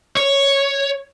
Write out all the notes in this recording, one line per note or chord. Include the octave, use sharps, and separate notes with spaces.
C#5